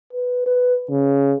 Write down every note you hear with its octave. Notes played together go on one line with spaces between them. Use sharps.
B4
B4
C#3